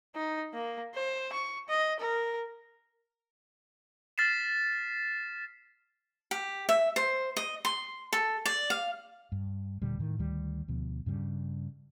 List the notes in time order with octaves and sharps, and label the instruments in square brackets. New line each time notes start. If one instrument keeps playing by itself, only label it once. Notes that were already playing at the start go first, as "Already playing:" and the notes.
[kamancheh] D#4
A#3
C5
C#6
D#5
A#4
[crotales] F6 A6 B6 C7 E7
[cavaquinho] G4
E5
C5
D#5
C6
A4
D5
F5
[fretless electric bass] G2
D#1 A#2 D3 G3
A2 D#3
D2 D#3 G3
D2 B2 F3
G2 C#3 G3